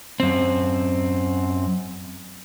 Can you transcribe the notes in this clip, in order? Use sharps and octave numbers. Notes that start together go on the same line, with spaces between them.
F#2 C4